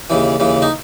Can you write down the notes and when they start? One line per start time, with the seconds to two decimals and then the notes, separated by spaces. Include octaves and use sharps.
0.10 D#2 C#3 E3
0.40 D#2 C#3 E3
0.62 D#4